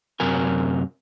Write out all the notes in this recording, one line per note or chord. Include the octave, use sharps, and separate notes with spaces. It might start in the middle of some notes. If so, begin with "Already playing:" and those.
F#2 C3 A#4 G#5